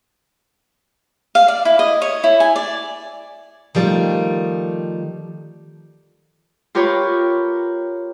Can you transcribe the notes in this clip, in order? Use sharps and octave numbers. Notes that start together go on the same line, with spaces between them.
F5
D5
E4
D#5
C#5
E4
G#5
D5
D#3 F3 G3 A3
F4 G4 A#4 B4 C#5